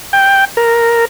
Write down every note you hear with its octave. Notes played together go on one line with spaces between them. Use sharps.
G5
A#4